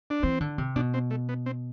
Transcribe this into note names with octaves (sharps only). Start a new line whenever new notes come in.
D4
E3 C4
D3
C3
B2 D4
C4
A3
B3
C4